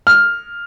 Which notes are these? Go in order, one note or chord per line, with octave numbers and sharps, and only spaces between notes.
F6